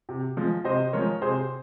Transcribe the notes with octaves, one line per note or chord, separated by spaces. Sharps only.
C3
F3 G#3
C3 C5 D#5
F3 G#3 A#4 C#5
C3 G#4 C5